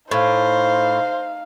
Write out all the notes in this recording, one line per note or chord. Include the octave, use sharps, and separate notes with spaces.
A2 D#4 C5 F5